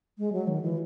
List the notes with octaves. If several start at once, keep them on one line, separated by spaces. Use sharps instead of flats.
G#3
F#3
D#3
E3